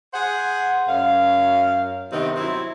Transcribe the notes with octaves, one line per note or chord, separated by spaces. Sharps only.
G#4 C5 F#5
F#2 F5
G2 C3 D#3 B3 D#4
F#3 C4 E4